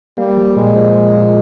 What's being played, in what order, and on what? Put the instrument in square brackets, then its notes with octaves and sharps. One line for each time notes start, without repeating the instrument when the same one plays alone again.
[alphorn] G3 [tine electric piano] A#3
[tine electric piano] F3
[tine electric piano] A#2 [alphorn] G#3
[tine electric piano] F3
A#2
A#2